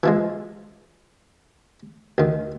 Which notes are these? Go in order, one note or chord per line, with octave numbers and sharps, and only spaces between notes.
E3 F3 G#3
D2 D#3